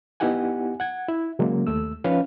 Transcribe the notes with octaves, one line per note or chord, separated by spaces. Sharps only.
B3 D#4 E4 G4 F#5 G#5
F#5 G#6
E4
C#3 F#3 G#3 A#3
D#2 A3 E6
F3 C#4 D#4 B4 C#5 F5